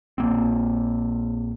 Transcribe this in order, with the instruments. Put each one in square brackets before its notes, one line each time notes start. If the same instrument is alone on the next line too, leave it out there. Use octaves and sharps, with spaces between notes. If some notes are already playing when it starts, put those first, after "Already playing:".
[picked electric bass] A#1 A#3 C4